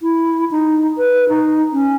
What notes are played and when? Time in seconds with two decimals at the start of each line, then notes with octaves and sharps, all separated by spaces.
0.01 E4
0.51 D#4
0.98 B4
1.29 D#4
1.73 C#4